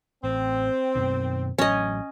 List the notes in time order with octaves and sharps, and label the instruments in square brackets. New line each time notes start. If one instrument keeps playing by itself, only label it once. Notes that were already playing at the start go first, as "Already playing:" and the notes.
[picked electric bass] A1 [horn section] C4
[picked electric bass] F#2 B2 D#3
[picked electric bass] A1 F#3 [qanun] C#4 D#5